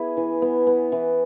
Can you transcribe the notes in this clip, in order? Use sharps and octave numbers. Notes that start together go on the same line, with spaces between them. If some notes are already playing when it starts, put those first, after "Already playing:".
Already playing: B3 E4 G#4 B4
E3
B3
B3
E3